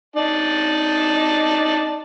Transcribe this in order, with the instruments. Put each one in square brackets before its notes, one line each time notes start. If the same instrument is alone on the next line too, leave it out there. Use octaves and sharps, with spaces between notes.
[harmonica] D#4 D5 A5